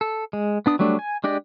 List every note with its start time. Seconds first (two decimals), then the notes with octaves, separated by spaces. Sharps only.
0.01 A4
0.33 G#3
0.66 B3 D4 D#6
0.79 F#3 G3 A3 D4
0.99 G#5
1.24 G#3 D4 G4 D5 D#5